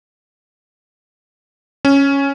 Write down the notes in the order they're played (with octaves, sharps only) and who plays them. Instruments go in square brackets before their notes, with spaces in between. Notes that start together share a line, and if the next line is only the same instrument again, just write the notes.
[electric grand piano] C#4